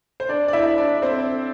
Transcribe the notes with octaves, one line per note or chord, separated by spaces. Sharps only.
C5
D4 D5
D5
E4 E5
D4 D5
C4 C5